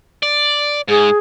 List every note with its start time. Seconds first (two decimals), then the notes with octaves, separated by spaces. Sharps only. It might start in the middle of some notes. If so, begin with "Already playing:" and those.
0.23 D5
0.88 G#2 G#4